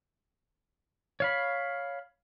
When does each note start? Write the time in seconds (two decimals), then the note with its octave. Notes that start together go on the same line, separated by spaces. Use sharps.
1.20 C#5 F5 B5